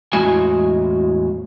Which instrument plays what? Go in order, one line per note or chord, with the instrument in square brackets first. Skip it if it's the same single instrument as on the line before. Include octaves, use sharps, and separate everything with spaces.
[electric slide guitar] E2 A2 G#3 F#4 G#5